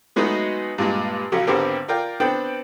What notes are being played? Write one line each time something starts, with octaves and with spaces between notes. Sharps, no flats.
F#3 G#3 A3 B3 D#4 F#4
G2 A#2 G#3
A#1 C#3 F#3
G#1 D3 B3 C4 G4 A#4
F4 A#4 D5 G5
B3 C4 D4 G5